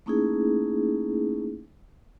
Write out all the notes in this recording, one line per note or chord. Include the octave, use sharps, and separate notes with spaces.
A3 A#3 C#4 D#4 E4 G#4